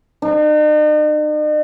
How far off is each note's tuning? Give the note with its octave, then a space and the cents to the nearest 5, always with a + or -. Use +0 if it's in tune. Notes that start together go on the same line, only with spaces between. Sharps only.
D#4 -45